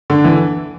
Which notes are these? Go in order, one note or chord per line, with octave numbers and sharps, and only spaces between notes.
D3
E3